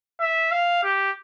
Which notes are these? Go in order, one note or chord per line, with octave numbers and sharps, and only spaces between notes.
E5
F5
G4